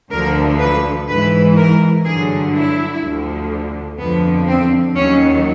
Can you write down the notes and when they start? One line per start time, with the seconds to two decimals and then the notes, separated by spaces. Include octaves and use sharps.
0.10 D2 D3 F3 A#4
0.58 B4
1.07 G#2 E3 B4
1.56 A#4
2.04 G2 D3 F#3 G#4
2.53 E4
3.01 D2 D3 F3
3.98 F2 D3 F3 B3
4.47 C4
4.95 D#2 D#3 F#3 C#4